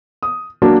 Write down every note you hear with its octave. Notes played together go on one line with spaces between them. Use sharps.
D#6
F#3 A#3 D4 F#4 A#4